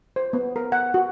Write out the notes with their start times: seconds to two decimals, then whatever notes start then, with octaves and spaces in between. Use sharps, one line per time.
0.16 C5
0.33 B3
0.56 A#4
0.72 F#5
0.94 F#4